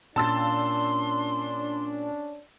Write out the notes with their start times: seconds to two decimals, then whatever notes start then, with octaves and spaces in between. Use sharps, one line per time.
0.16 A#2 C#4 D4 A5 C6 E6 A6